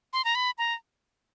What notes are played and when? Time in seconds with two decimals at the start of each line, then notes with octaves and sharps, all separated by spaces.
0.13 C6
0.25 A#5
0.35 B5
0.58 A#5